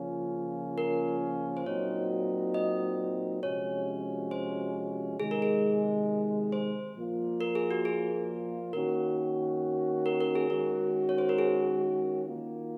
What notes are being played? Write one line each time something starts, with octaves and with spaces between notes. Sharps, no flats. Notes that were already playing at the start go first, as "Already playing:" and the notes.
Already playing: C#3 F3 A#3 C#4 F4
A#4
C5
A#2 F#3 C4 D#4 F#4 C#5
D#5
C3 F3 G#3 C#4 F#4 C#5
C5
C3 D#3 G#3 G#4
A#4
G#4
C5
A#2 F3 A#3 F4
A#4
G#4
F#4
G#4
D#3 A#3 C#4 F#4 A#4
A#4
A#4
G#4
D#3 G#3 C#4 F#4 A#4
C#5
C5
A#4
G#4
D#3 A#3 F4